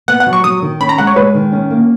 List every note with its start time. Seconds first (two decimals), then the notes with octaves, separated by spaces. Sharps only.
0.08 B3 F#5
0.20 F#5
0.26 F#3
0.33 C#6
0.44 F#3 D#6
0.62 D#3
0.80 C#4 B5
0.89 A#5
0.98 G#3 F#5
1.07 C#5
1.16 G#3 B4
1.35 D#3
1.52 C#4
1.70 A#3